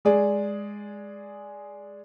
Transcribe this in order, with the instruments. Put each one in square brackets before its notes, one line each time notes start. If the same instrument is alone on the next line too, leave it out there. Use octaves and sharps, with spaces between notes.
[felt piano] G#3 G#4 D5